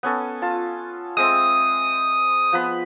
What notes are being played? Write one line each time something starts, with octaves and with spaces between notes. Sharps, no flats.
B3 C#4 A4
F4 A5
G#3 C4 E5 D#6
F3 B3 B5